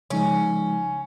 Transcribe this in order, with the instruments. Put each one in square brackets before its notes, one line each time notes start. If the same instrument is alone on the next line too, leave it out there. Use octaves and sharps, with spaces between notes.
[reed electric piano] C#3 F3 G#3 D#4 [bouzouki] C#4